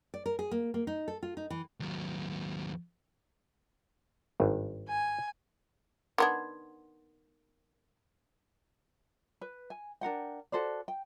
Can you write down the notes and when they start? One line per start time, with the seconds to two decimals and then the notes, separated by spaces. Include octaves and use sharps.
0.14 D5
0.26 A#4
0.39 G#4
0.51 A#3
0.74 A#3
0.87 D#4
1.08 A4
1.23 F4
1.37 D#4
1.50 E3
1.80 D#2 F#3
4.40 G#1 G2
4.89 G#5
6.18 D#3 B3 D4 C6 G#6
9.41 B4
9.70 G#5
10.01 D4 A#4 F#5 G5
10.52 F#4 A4 C5 D5
10.88 G5